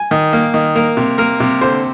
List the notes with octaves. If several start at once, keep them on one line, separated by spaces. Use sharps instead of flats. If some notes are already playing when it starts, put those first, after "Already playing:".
Already playing: G#5
D#3
A#3
D#3
A#3 A#4
C3
A#3 A#4
C3
D3 C5